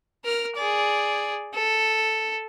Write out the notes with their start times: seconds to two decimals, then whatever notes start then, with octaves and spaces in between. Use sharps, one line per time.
0.25 A#4 F6
0.56 G#4 D5
1.54 A4